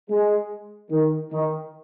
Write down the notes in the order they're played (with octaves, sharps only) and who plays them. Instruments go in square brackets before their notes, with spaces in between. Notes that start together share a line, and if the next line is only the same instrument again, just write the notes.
[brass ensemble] G#3
D#3
D#3